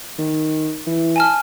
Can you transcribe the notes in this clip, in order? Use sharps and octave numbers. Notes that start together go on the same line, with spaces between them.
D#3
E3
G#5 A5 F6